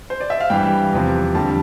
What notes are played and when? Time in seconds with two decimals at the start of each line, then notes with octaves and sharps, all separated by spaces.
0.10 C5
0.21 D5
0.30 E5
0.40 F5
0.50 G2 E3 G3 G5
0.92 E2 C3 F3
1.35 F2 D3 G3 A5